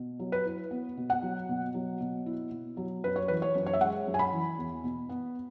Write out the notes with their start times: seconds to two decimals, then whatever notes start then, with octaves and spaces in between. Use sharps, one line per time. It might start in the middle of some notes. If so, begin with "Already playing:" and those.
Already playing: B2
0.19 F#3
0.32 B4
0.46 E4
0.71 B3
0.97 B2
1.10 F#5
1.22 F#3
1.49 B2
1.74 F#3
2.00 B2
2.26 E4
2.51 B2
2.77 F#3
3.04 F#2 B4
3.16 C#5
3.28 E3 B4
3.42 C#5
3.55 F#2
3.66 C#5
3.73 E5
3.80 G#3 F#5
4.07 F#2
4.14 G#5
4.19 B5
4.33 E3
4.58 E2
4.84 B2
5.09 B3